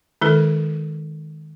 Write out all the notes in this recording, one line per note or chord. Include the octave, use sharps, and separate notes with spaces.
D#3 G#3 E4 A4 B4